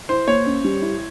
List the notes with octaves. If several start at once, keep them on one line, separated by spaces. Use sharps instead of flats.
E4 C5
A#3 C#5
C#4
G3
E4